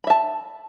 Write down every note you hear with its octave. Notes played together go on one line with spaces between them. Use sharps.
E5 A5 B5